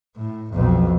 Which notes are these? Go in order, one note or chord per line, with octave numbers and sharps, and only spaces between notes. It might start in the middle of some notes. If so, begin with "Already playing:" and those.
A2
B1 F2